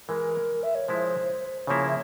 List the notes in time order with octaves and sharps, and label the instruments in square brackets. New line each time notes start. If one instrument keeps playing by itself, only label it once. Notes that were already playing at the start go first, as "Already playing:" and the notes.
[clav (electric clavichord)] E3 G#3 E4 [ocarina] A#4
[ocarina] E5
C#5
[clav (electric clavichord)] F3 G#3 E4 [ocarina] C5
[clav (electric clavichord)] C#3 F3 A#3 E4 [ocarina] C#5
[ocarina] E5